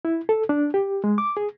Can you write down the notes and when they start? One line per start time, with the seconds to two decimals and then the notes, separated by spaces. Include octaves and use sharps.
0.05 E4
0.29 A4
0.49 D4
0.74 G4
1.04 G#3
1.18 D6
1.37 G#4